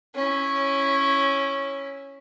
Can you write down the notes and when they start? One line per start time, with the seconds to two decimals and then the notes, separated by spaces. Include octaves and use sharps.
0.15 C#4 E4